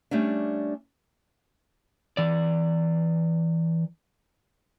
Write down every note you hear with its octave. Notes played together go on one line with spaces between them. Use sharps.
G3 A3 C#4 D4
E3 D5